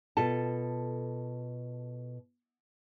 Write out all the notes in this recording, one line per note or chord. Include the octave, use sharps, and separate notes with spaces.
B2 F4 A4 A5